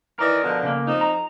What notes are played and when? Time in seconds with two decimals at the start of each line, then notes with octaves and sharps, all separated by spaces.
0.19 E3 A#4 D5 D#5
0.43 B2 D3 F3
0.63 C#3 A#3
0.86 F2 D#4
1.01 A#5